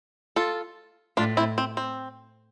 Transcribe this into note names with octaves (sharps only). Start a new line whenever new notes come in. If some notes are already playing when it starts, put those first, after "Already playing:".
F4 A4
A2 D4 F4
C4 E4
C4
C4